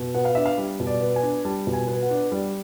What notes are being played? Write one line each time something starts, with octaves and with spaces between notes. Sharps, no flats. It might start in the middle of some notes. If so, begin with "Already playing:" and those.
Already playing: B2
B3 F#5
F5
D4 E5
F5
G3
B2
D5
B3
G#5
D4
G3 A5
B2
G#5
B3
F#5
D4
G3 D5